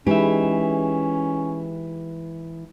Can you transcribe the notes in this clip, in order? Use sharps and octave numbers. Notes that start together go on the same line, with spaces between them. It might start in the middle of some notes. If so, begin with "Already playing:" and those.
E3 G#3 C#4 D#4 G4 E5